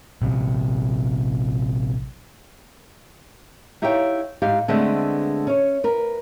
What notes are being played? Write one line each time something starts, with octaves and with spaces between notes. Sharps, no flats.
A#1 C3
D#4 E4 G4 C#5 F5 G5
G#2 G4 F5
D3 G#3 A3 B3 C4 D4
C#4 C#5
A#4 B4